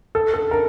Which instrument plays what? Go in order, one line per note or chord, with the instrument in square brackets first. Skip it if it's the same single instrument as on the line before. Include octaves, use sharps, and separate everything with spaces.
[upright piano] A4
A4
A#4